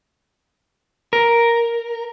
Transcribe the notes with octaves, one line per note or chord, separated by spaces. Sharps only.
A#4